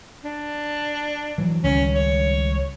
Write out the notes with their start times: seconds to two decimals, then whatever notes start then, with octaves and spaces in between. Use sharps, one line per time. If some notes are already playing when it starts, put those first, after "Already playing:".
0.25 D4
1.38 E3 F#3
1.64 C#2 D#3 G3 C#4
1.95 C#5